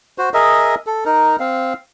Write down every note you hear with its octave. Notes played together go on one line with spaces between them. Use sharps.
F#4 C5
G#4 A#4 D#5 E5
A4
D#4 A#4
C4 F5